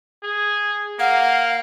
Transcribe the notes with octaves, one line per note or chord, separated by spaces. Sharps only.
G#4
A#3 F5 F#5